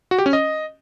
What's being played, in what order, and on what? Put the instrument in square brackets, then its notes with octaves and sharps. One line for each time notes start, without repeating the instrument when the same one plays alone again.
[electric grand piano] F#4
G4
C#4
D#5